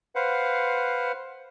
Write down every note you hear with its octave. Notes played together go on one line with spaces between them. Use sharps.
B4 C5 F5 F#5